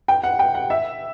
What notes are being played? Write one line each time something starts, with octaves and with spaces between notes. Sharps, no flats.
G5
F#5
G5
F#5
E5